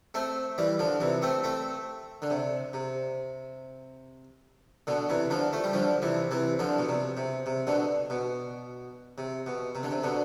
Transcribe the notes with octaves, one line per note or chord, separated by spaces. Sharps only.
A3 C4
E3 G3
D3 F3
C3 E3
A3 C4
A3 C4
D3
C3
C3
B2 D3
C3 E3
D3 F3
A3
G3
D3 F3
C3 E3
C3 E3
D3 F3
B2
C3
C3
C3
B2 D3
B2
C3
B2
C3
D3
C3
B2 D3